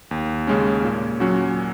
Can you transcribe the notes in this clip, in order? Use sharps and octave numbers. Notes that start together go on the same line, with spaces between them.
D#2
C#3 G#3 C#4
A#2
F#3 C#4 F#4